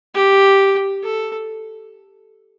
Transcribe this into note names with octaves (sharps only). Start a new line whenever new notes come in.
G4
A4